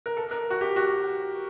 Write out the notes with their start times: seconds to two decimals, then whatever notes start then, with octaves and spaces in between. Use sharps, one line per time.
0.06 A#4
0.17 A4
0.31 A#4
0.50 F#4
0.61 G4
0.76 F#4